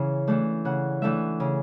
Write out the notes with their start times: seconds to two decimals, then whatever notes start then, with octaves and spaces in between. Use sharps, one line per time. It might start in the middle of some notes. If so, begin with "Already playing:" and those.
Already playing: C#3 E3
0.28 E3 A3 D4
0.65 C#3 F#5
1.02 E3 A3 D4 E5
1.40 C#3